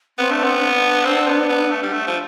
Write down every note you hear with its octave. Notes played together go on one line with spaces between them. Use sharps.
B3 C4
A3 D4
B3 C4
D4
C4
B3
B3
A3
G3
A3
F3